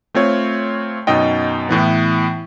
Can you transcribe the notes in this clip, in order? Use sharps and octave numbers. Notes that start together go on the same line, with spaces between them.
A3 C4 F4 C#5
F#2 B2 D#4 D#5 G5
A2 E3 B3